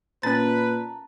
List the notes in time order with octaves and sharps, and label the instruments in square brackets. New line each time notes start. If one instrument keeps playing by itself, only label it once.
[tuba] A#2 [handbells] C#4 A6 [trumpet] B4 [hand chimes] A5 A#5